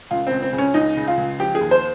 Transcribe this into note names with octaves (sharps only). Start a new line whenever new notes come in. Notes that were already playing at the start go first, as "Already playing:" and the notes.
C#2 F4
C#2 C4
C4
C#3
C#4
C#2 D#4
C#3
F4
C#2
F3 G4
G#4
D#2
C5